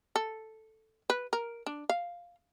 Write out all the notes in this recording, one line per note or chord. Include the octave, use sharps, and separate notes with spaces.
A4
B4
A#4
D4
F5